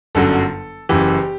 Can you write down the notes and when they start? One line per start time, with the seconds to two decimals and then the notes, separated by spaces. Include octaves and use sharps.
0.15 G1 F#2 D3 F#3 A4
0.89 F#1 F#2 E3 G4